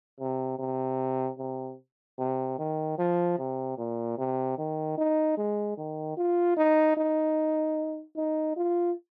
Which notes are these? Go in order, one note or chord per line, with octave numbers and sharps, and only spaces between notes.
C3
C3
C3
C3
D#3
F3
C3
A#2
C3
D#3
D#4
G#3
D#3
F4
D#4
D#4
D#4
F4